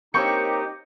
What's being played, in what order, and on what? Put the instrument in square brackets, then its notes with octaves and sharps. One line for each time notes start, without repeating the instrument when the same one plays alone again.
[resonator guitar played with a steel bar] A#3 C4 C#5 [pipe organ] D#4 G4 [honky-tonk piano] C#6 G6 C#7